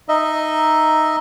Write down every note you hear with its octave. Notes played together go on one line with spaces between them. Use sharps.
D#4 D#5 E5